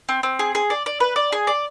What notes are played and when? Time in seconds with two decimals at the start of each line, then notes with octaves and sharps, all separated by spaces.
0.09 C4
0.23 C4
0.39 G#4
0.55 G#4
0.70 D5
0.86 D5
1.00 B4
1.16 D5
1.32 G#4
1.47 D5